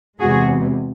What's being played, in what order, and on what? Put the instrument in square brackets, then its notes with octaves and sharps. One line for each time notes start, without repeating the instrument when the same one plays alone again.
[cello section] E2 C3 E3 G#3 F#4 G#4